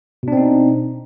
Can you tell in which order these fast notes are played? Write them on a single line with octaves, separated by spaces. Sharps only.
B2 D4 C4 D#4